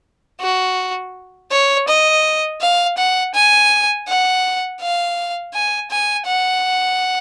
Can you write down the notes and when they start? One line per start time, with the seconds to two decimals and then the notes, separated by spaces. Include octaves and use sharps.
0.41 F#4
1.51 C#5
1.88 D#5
2.61 F5
2.97 F#5
3.34 G#5
4.08 F#5
4.81 F5
5.54 G#5
5.90 G#5
6.27 F#5